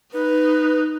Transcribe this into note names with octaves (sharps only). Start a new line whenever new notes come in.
D#4 B4